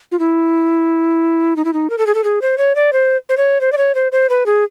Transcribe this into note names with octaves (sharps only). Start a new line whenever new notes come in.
F4
E4
D#4
E4
D#4
A#4
A4
G#4
A4
G#4
C5
C#5
D5
C5
C5
C#5
C5
D5
C#5
C5
C5
B4
G#4